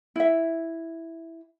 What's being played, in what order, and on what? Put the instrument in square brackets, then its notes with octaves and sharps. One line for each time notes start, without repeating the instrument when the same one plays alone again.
[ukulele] E4 E5